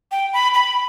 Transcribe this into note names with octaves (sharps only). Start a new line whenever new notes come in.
G5
B5
B5